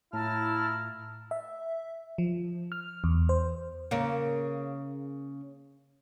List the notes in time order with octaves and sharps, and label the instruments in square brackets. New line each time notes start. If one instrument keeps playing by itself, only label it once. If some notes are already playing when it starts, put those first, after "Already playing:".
[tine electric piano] A2 [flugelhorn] E4 [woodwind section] F4 A#5 F6 [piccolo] A5
[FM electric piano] E5
F3
F6
E2
C5
[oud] C#3 A#3